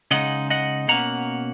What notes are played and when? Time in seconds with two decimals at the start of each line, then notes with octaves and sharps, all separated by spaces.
0.11 C#3 G#3 D#4 D#5 F#5
0.50 D#5 F#5
0.88 B2 A#3 C#4 F#5 A#5